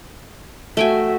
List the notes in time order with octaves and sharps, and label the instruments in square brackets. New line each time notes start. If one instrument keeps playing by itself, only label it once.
[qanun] A3 G5 G#5 [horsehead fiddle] F#4 E5